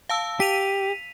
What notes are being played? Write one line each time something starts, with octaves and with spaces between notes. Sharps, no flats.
F5 A5 E6
G4 B6 D#7 F7